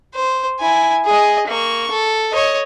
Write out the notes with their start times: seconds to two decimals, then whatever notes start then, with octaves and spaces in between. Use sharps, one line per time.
0.15 C5
0.60 E4 G#5
1.05 G#4 D#5
1.47 A#3 C#6
1.91 A4
2.33 C#5 D#5